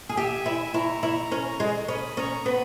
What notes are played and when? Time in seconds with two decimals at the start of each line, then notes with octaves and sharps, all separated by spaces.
0.09 G#4
0.17 G4 E5 G#5
0.46 E4
0.74 E4 A#5 C#6
1.03 E4
1.32 C#4
1.60 G#3
1.88 C#4 B5 D#6
2.17 C#4 A#5 C#6
2.45 B3 B5 D#6